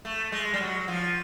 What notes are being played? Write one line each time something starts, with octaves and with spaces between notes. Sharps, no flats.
A3
G#3
G3
F#3
F3